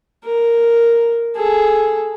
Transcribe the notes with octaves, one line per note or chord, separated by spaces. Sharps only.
A#4
G#4 A4